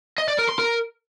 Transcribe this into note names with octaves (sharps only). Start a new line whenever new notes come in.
D#5
D5
A#4
C6
A#4